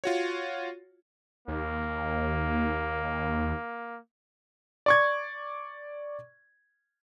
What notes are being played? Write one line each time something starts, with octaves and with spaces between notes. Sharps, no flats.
F4 F#4 C#5
D#2 A#3
D5 C#6 G#6